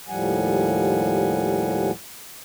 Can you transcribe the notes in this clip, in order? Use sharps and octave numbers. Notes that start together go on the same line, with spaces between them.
D#2 A2 F3 G3 F#5 G#5